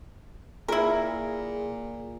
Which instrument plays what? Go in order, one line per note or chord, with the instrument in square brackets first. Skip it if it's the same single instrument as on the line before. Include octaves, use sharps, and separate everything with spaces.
[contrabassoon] A#2 [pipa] E4 A#4 [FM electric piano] G#4